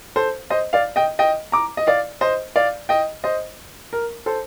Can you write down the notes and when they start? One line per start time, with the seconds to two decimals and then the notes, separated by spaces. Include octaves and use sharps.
0.16 A4 C5
0.50 C5 D#5
0.73 D5 F5
0.96 D#5 G5
1.19 D#5 G5
1.52 A#5 D6
1.77 D#5
1.87 D5 F5
2.21 C5 D#5
2.56 D5 F5
2.89 D#5 G5
3.24 C5 D#5
3.93 A#4
4.26 A4 C5